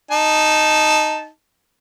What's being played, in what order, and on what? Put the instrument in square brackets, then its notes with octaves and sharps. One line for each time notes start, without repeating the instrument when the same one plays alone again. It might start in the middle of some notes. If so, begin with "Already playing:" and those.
[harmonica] D#4 A5